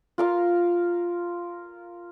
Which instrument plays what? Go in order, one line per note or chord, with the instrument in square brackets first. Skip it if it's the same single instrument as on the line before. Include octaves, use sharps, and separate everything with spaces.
[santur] F4 A#4 F5